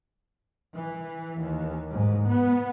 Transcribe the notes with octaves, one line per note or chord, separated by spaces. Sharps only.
E3
D#2
G#2
B3